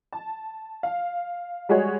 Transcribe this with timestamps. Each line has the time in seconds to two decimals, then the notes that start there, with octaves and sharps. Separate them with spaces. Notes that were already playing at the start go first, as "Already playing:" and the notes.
0.13 A5
0.83 F5
1.69 G3 G#3 F#4 G#4 C#5